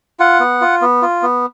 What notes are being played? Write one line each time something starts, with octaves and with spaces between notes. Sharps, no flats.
F4 F#5
B3
F4
B3
F4
B3